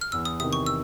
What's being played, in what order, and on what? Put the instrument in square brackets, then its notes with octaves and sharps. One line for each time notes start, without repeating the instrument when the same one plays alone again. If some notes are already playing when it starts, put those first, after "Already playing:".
[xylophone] F6
[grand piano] E2 [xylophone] E6
[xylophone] D#6
[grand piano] C3 D#3 [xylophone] D#6
[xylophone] C#6
E6